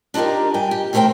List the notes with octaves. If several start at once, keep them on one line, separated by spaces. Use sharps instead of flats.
D4 D#4 F4 G4 A#4
G2 G5 G#5
G4
E2 A3 B3 A#4 C5 G5